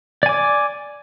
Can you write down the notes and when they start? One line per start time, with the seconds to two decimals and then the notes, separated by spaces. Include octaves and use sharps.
0.23 D5
0.26 G#5
0.29 D6